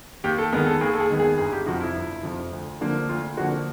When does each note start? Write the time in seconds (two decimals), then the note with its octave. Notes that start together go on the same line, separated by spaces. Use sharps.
0.24 D#2 G4
0.38 A4
0.52 D#3 G#3 B3 A#4
0.67 A4
0.81 D#2 G#4
0.93 A4
1.00 G#4
1.09 D#3 G#3 B3
1.19 G#4
1.38 G1 G#4
1.52 G4
1.66 F2 C3 F3 F#4
1.81 E4
1.95 G1
2.23 F2 C3 F3
2.52 D2
2.81 D3 F3 A#3
3.09 D2 F4
3.37 D3 F3 A#3 F#4